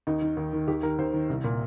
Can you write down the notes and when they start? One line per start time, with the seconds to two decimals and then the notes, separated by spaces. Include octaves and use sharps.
0.07 D#2 D#4
0.22 D#3
0.37 D#2
0.53 D#3
0.68 D#2 G4
0.83 D#3 A#4
0.98 D#2 C5
1.13 D#3
1.29 C2
1.44 A#2